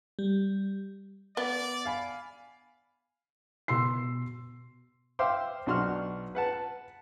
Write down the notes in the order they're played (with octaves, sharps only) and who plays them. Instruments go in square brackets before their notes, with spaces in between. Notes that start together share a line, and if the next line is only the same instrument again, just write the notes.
[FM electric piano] G3
[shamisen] B3 [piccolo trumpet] D5
[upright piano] F5 G#5 B5
[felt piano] B2 C6 E6 C7
[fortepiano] C5 E5 F5 G5 C6 D6
B1 D4 F#4 C6 C#6 F6
B4 F#5 A5